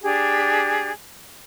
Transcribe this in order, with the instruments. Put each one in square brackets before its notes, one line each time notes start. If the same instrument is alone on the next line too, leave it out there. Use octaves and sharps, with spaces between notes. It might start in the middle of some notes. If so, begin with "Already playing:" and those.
[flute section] D4 G4 G#4